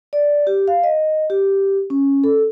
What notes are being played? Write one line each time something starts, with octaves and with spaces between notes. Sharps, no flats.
D5
G4
F5
D#5
G4
C#4
A4